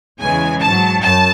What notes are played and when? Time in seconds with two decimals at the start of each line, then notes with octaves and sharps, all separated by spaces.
0.21 E2 C#3 E3 G#3 G#5
0.62 G#2 F#3 A5
1.03 F#2 A5